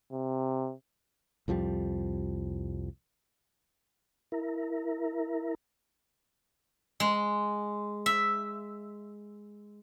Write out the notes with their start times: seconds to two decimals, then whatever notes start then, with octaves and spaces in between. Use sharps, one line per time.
0.12 C3
1.48 C2 F2 F3 G3
4.32 E4 A#4
7.00 G#3
8.06 E5